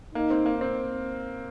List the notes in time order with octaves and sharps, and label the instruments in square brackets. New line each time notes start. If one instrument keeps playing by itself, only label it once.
[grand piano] A#3 [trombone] D#4
[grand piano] C4
A#3
C4